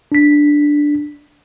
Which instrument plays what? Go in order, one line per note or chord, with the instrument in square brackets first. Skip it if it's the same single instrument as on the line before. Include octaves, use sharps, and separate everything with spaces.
[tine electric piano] D4 B6